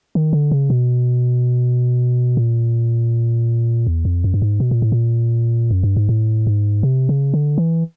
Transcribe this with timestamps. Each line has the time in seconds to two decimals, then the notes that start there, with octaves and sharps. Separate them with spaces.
0.15 D#3
0.33 D3
0.51 C#3
0.70 B2
2.37 A#2
3.87 E2
4.05 F2
4.24 F#2
4.34 G2
4.42 G#2
4.60 B2
4.71 A#2
4.82 A2
4.92 A#2
5.71 F#2
5.83 G2
5.96 G#2
6.09 A2
6.47 G#2
6.83 C3
7.09 C#3
7.34 D3
7.58 E3